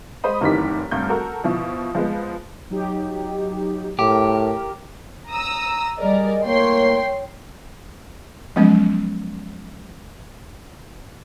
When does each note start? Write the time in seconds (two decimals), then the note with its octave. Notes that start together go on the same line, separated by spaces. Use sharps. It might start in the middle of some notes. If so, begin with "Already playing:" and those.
0.24 G#3 C5 D#5 B5 D#6
0.41 F1 F#2 D#3 E3 G4 B6
0.91 F1 G2 G6
1.09 F#4 A4 A#4
1.44 B2 F3 E4
1.95 F3 G#3 B3
2.70 F#3 D#4 G4
3.99 A2 G4 A#4
5.29 A#5 D#6 E6
5.99 G3 G#4 A#4 D5 D#5
6.46 A2 A#3 C#5 G5 C6
8.56 F3 F#3 G#3 B3 C#4